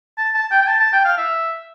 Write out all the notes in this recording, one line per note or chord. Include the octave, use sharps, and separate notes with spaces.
A5
A5
G5
G5
A5
A5
G5
F5
E5